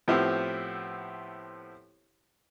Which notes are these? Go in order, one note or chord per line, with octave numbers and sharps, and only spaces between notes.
A2 F3 B3 C4 E4 G4